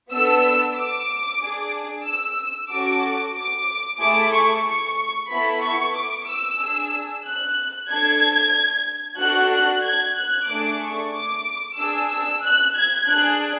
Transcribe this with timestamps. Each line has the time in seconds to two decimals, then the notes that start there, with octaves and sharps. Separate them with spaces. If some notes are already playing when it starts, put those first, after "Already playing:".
0.11 B3 D4 A4 E6
0.76 D6
1.41 D4 G#4
2.06 E6
2.70 C#4 F#4 A4 D6
3.36 D6
4.00 A3 E4 G#4 D6
4.33 C#6
4.66 C#6
5.30 B3 E4 A4 B5
5.63 C#6
5.95 D6
6.28 E6
6.59 D4 G#4
7.25 F#6
7.89 D4 A4 G#6
9.19 D4 F#4 A4 F#6
9.52 F#6
9.84 G#6
10.16 F#6
10.48 A3 D4 G#4 D6
10.82 C#6
11.14 D6
11.78 D4 G#4 E6
12.11 E6
12.44 F#6
12.76 G#6
13.08 D4 G#4 F#6